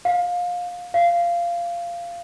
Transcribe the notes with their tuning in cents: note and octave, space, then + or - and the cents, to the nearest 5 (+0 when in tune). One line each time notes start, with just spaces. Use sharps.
F5 +25
F5 -15